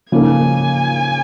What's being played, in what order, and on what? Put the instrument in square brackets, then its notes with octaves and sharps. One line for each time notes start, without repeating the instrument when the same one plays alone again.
[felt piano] C#3 F3 A#3 D#4 A#4 [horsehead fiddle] G#5